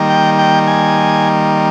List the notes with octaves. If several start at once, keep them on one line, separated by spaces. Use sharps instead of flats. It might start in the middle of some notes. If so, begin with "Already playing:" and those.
Already playing: D#3 G3 A#3
G5
G5
G#5